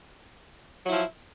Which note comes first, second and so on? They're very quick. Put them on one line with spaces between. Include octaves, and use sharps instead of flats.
F#3 E4 F3